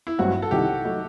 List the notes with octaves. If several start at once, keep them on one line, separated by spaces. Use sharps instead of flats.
E4
A1 G2 F#3 C4 E4 F#4
A4
C2 C3 D#3 G4
F#3 A3 D#4